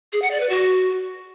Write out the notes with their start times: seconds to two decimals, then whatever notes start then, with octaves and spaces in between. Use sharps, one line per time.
0.13 G#4
0.22 F#5
0.31 D5
0.40 B4
0.49 F#4